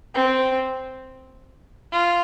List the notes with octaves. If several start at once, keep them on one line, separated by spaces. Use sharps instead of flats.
C4
F4